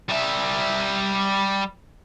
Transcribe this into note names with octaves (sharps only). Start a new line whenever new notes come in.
G3 E5